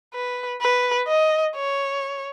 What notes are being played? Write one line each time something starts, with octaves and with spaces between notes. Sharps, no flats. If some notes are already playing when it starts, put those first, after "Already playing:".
B4
B4
D#5
C#5